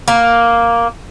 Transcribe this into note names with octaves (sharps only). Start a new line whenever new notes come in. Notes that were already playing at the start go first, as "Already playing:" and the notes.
A#3